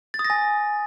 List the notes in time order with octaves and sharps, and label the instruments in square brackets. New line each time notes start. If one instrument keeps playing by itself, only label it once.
[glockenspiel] A6
D#6
A#6
G#5